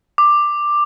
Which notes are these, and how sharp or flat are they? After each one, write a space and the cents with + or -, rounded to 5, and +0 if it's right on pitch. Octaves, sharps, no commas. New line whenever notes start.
D6 +10